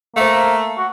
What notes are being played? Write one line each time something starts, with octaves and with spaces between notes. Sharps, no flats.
A3 A#3 C5 F5
F#4